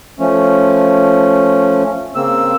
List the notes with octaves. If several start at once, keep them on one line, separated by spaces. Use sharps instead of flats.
F3 A3 C#4
C#3 A#3 C4 E6